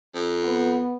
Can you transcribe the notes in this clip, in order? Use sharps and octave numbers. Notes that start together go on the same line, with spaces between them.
F2
B3